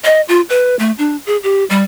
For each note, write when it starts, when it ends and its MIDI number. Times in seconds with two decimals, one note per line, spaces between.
0.04 0.21 75
0.28 0.41 65
0.49 0.75 71
0.79 0.92 57
0.98 1.17 62
1.26 1.37 68
1.43 1.64 67
1.70 1.83 55